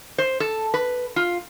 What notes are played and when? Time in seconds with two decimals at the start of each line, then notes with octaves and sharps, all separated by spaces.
0.18 C5
0.40 A4
0.74 B4
1.16 F4